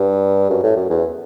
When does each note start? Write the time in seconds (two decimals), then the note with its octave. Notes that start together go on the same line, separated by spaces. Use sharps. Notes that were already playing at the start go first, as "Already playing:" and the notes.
Already playing: G2
0.50 F#2
0.63 A2
0.77 F#2
0.90 E2